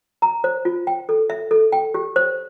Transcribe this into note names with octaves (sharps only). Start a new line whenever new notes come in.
A#5
C5
F4
G5
A4
E5
A4
G5
G4
C5